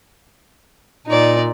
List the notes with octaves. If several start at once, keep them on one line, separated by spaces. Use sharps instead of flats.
A#2 D#4 D5